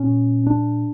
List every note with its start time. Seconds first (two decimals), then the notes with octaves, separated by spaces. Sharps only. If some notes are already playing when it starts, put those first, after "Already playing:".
Already playing: A#2 C#4
0.47 D4